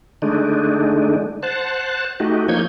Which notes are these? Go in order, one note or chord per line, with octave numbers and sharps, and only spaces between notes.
D3 G#3 A3 D4 D#4
C5 F#5 A5
A3 D#4 F#4 G4
F3 A#3 D#4 C#5 G6 G#6